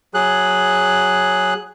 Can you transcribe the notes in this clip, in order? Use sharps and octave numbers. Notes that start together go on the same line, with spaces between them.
F#3 G#4 F#6